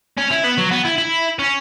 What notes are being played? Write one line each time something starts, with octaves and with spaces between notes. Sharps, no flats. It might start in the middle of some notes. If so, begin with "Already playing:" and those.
C#4
E4
B3
F#3
B3
E4
E4
C#4